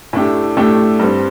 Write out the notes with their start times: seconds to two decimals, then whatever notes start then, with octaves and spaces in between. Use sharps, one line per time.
0.13 A2 A3 D4 G4
0.57 A2 A3 D4 G4
0.99 G2 G3 C4